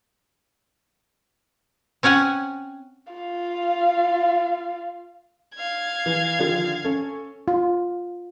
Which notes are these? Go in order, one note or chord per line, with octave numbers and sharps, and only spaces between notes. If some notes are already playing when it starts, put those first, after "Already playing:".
C4 C#4 C#5 F#5 G#5
F4 F5
F5 G#6
E3
D3 D#3 F3
C#4 A4
F4